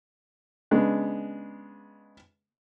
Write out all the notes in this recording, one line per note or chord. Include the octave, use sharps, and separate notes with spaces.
C#3 G#3 B3 D4